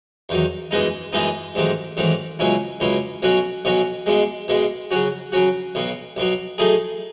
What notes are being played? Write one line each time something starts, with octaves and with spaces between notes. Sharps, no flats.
E2 D#3 F#3
F#2 E3 G#3 B3 D#4
F#2 E3 G#3 B3 D#4
A1 G#2 D#3 F#3
A1 G#2 D#3 F#3
C#2 B2 F#3 C#4 E4
C#2 B2 F#3 C#4 E4
B1 B2 F#3 C#4 F#4
B1 B2 F#3 C#4 F#4
B1 B2 G#3
B1 B2 G#3
C#3 F#3 C#4 F#4
C#3 F#3 C#4 F#4
B1 B2 F#3
B1 B2 F#3
A2 F#3 A3 D#4 G#4